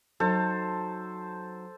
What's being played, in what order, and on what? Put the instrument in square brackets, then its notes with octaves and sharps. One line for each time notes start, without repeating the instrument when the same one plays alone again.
[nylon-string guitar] F#3 D#4 [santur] A4 C5